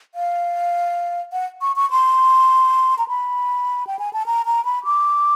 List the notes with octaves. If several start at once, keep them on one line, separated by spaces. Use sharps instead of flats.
F5
F#5
C#6
C#6
C6
A#5
B5
G5
G#5
A5
A#5
A#5
B5
D6